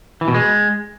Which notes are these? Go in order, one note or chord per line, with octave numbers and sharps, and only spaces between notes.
E3
B2
G#3